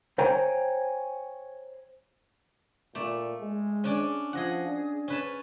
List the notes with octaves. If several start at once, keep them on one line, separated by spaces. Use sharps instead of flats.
C5 C#5 G5 G#5 A#5
A#2 A3 D5
G#3
C#4 D4 D5
F3 G#4 D#5 F#5
D4
C#4 B4 A5